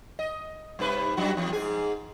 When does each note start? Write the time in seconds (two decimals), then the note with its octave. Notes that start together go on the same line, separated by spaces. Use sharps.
0.19 D#5
0.79 G2 C3 B4
1.17 F#2 G3 F#4
1.37 E2
1.53 G#2 G#4